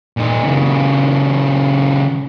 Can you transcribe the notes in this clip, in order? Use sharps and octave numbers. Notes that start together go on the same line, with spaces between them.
A#2 D#4
A#2 C#3